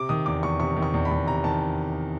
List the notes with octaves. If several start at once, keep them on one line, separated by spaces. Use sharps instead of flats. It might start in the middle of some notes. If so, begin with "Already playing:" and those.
Already playing: C3 D6
D#3 D#6
E2 D6
E2 C#6
C3 C#6
D#3
C#6
E2
B5
E2
C3 A#5
D#3 A5